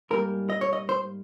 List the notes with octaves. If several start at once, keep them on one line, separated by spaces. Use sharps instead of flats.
G#2 G3 A#3 A#4
D#5
C#5
D#5
C5